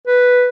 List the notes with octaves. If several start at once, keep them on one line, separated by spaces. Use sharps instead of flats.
B4